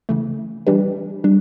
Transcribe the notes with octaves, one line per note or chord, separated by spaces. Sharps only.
C#3 E3 A3
E3 G3 D4 G4 B4
G3 D4